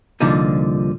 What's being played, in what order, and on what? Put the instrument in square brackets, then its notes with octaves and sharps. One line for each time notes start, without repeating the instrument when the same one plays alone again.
[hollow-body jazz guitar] C2 A#2 D3 F3 D#4